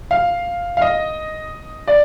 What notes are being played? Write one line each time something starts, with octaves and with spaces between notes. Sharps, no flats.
F5
F5
D#5
D5